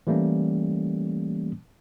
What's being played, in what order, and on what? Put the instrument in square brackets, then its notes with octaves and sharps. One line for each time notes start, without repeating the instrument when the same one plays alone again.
[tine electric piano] E3 G3 A3 A#3 C#4